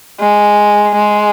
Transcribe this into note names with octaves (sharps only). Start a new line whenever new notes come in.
G#3
G#3